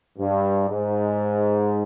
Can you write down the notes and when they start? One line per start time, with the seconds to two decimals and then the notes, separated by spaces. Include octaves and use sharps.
0.18 G2
0.69 G#2